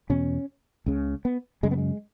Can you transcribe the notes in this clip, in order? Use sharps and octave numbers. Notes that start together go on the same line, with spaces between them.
E2 B2 C#4
C#2 C#3
B3
F#2 C#3 G#3
B3
G#3